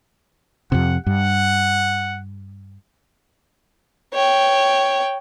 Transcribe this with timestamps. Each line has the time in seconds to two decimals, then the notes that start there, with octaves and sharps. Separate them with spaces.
0.72 F2 C3 F#5
1.06 G2 F#5
4.14 C#5 G5